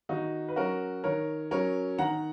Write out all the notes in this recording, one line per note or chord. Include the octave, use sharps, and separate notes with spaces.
D#3 D#4 F#4
B4
F#3 C#4 F#4 A#4
D#3 A#4 C#5
F#3 C#4 A#4 C#5
D#3 F#5 A#5